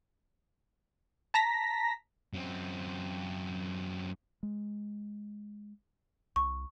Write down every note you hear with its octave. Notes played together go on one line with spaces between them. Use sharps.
A5 A#5 A#6 B6
F#2 C4
G#3
C2 C#6